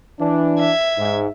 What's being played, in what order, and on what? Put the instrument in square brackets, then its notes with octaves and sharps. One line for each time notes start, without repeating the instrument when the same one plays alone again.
[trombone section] E3 D4
[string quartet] E5 G#6
[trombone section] G#2